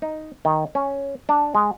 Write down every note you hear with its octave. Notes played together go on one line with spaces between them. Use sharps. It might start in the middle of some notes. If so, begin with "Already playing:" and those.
D#4
D#3
C#4
D4
G#3